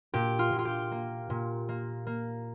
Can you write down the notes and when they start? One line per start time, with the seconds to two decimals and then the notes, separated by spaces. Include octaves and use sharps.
0.14 A#2 G4
0.39 F4
0.52 A#2
0.59 F4
0.65 G4
0.92 A#3
1.30 A#2
1.69 A#3
2.07 A#3